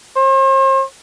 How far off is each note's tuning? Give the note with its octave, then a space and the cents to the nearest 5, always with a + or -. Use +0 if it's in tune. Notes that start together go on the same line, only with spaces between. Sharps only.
C5 +40